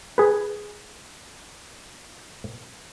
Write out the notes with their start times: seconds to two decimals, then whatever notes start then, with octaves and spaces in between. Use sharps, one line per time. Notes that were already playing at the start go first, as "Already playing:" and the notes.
0.18 G#4 B4